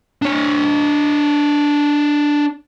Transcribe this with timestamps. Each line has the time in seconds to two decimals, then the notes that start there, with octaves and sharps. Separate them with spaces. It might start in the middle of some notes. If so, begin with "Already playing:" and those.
0.22 D4 C#5